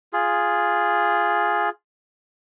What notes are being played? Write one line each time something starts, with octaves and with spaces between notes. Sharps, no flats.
F4 G#4